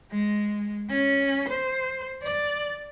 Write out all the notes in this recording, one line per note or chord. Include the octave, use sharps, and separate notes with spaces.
G#3
C#4
C5
D5